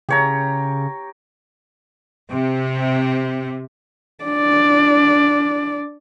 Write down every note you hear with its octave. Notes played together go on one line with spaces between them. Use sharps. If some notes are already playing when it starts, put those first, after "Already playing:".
C#3 G4 C#5 A#5
C3
D4 D5